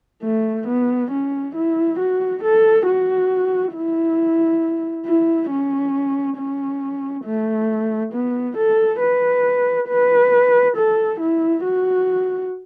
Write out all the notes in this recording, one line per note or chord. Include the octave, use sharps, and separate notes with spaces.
A3
B3
C#4
E4
F#4
A4
F#4
E4
E4
C#4
C#4
A3
B3
A4
B4
B4
A4
E4
F#4